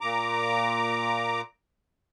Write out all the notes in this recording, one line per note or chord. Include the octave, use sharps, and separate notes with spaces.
A#2 A#5 D6